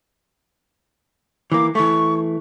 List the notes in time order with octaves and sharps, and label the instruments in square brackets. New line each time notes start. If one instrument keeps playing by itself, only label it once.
[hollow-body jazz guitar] E3 A#3 [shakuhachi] D6
[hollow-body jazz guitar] E3 A3 [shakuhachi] C#6